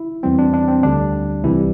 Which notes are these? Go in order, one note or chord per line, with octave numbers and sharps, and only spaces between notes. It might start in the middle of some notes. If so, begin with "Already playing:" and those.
Already playing: E4
E2 E3 G3 C4
D4
D4
C4
D2 D3 G3 D4
C2 C3 E3 G3 E4